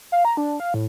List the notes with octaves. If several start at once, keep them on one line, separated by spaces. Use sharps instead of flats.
F5
A#5
D4
F5
A2